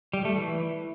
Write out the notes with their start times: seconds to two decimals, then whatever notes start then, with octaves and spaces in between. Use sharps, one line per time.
0.13 G3
0.25 A3
0.36 E3